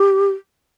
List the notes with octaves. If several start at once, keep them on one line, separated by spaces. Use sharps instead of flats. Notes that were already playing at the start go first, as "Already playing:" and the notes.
Already playing: G4